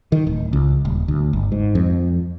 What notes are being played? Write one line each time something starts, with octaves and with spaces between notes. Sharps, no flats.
D#3
D1
C#2
D#1
D2
G1
G#2
F2